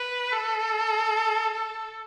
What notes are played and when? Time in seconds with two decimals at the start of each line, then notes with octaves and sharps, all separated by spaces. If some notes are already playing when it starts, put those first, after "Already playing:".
Already playing: B4
0.32 A4
1.54 A4